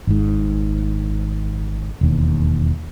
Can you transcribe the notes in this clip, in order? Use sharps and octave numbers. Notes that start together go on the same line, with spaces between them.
G#1 G#2
E1 D#2